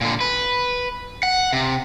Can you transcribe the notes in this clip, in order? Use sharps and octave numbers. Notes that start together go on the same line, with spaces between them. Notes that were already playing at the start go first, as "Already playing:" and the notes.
A#2 D3
B4
F#5
C3